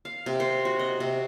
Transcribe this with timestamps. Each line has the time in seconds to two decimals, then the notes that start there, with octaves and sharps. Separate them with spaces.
0.05 F5
0.26 C3
0.40 C5
0.65 F#4
0.79 D#5
1.00 C3